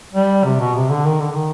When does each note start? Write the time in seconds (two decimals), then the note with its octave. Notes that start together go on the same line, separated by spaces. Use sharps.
0.13 G3
0.44 C3
0.60 B2
0.75 C3
0.90 D3
1.05 D#3
1.20 D3
1.30 D3
1.35 D#3